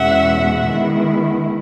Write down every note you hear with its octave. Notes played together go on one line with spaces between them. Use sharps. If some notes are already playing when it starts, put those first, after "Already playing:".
Already playing: E2 B2 G#3 C#4 E5 F#5
D#3 G#3 B3 E4